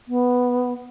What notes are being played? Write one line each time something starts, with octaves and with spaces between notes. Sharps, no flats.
B3